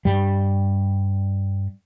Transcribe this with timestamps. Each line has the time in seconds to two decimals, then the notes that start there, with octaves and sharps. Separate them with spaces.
0.05 G2 G3